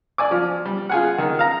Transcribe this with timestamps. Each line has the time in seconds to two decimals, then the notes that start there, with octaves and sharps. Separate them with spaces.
0.18 D5 G#5 D6
0.31 F3
0.66 G3
0.89 F4 G#4 F#5
1.18 D#3
1.39 F5 A#5